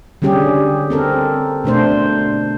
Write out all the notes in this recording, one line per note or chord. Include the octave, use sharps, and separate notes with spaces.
D3 G3 C#4 G4 G#4
C4 A4 A#4
B2 A3 D4 C5